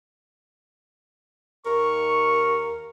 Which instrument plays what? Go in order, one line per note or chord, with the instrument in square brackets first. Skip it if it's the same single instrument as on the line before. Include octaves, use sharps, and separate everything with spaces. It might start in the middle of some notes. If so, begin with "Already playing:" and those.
[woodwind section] D#2 C#6 [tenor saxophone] A#4